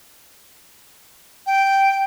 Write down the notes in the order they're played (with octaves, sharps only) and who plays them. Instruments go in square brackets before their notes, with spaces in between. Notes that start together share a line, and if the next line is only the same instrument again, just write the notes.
[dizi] G5